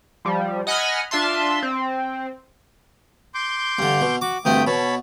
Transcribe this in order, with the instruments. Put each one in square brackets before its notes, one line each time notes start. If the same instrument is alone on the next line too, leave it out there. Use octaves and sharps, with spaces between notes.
[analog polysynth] F3 G3
D#5 F#5 G#5 B5 D#6 F6
D4 F4 E5 A5 C6
C4
[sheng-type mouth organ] C6 D6 G6
[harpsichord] G2 D3
B2
[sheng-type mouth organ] F#4 [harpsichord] D6
[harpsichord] D2 G2 C4 [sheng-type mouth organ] A3 G5 D#6
[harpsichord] B2 [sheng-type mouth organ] C#5 A5 B5